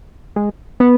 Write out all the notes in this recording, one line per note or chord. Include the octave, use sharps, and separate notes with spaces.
G#3
B3